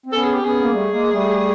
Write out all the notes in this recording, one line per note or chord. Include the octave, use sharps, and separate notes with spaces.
C4
B3 C#4 A4
G#4
G4
B3 C#4 G#4
A#3
G3 A3
G#3 A#3
G3 A3